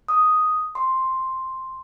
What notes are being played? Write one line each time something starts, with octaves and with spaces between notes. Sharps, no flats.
D#6
C6